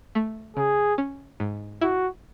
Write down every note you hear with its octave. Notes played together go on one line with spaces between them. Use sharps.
A3
C#3 G#4
C#4
G#2
E4 F#4